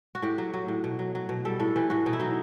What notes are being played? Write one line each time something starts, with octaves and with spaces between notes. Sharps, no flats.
F#4
A2 G4
F#3
F#3
A2
B2
F#3
F#3
B2
G3 A4
A2 A4
E3 G4
A2 F#4
B2 D#4
E4
F#3 D#4